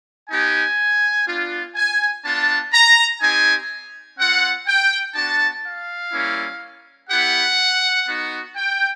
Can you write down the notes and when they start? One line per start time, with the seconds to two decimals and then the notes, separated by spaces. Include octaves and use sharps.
0.30 B3 D#4 G4 G#5
1.28 B3 D4 F4
1.76 G#5
2.25 B3 D4 F4 A5
2.73 A#5
3.21 C4 D#4 G4 G#5
4.18 C4 F4 F#5
4.67 G5
5.15 B3 D4 F#4 A5
5.65 F5
6.13 G3 A#3 C#4 E4
7.10 B3 E4 G4 F#5
8.06 B3 D#4 F#4
8.56 G5